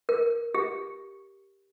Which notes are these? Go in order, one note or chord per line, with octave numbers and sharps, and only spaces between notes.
A#4
G4